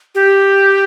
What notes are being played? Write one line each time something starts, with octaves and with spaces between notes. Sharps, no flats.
G4